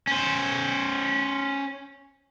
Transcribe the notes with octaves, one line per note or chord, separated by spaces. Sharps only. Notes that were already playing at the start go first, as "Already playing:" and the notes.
C#4 C5